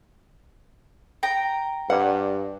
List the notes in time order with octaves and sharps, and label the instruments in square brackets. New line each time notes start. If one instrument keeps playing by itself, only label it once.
[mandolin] G5 A#5
[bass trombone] G2 [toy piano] B4 D5 D6 [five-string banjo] F#5